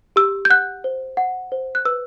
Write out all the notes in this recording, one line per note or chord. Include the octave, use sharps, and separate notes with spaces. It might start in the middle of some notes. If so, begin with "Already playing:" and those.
G4 E6
G6
F#5 F#6
C5
F#5
C5
F#6
B4 E6